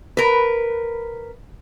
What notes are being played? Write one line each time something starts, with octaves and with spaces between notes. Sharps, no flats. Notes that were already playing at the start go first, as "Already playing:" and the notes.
A#4 B4